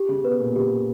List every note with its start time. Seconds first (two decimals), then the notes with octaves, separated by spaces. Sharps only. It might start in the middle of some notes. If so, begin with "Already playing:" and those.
Already playing: G4
0.08 C#3
0.24 B2 B4
0.40 A#2
0.55 C#3 G4